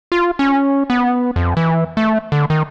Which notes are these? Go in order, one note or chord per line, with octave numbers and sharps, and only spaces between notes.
F4
C#4
B3
F2
E3
A3
D3
D#3